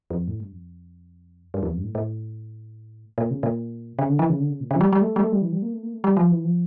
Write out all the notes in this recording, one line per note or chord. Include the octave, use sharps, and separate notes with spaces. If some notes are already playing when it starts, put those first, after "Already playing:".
F2
A2
G2
F2
G2
E2
F2
G2
A2
A2
A#2
C#3
A#2
C#3
D3
E3
C#3
D3
C#3
A#2
C#3
F3
G3
G3
A3
G3
A3
G3
E3
G3
A#3
A3
A#3
A3
G3
F3
E3
F3